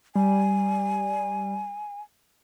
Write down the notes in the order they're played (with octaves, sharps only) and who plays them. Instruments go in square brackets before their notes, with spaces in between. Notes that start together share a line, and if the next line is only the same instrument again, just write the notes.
[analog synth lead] G3 [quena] G#5